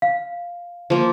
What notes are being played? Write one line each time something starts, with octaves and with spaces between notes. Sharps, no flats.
F5
F3 A#3